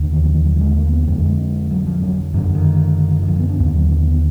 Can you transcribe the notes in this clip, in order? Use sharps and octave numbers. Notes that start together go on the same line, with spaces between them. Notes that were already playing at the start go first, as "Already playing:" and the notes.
Already playing: D#2 D3
D#3
F3
D#3
F#3
F#3
G#3
A#3
B3
F2 D3 G#3
F#3
G#3
F#3
F3
F#3
F#2 D3 F#3
D#3
D#3
F3
B3
D4
D#2 D3 B3
F#3
B3
B3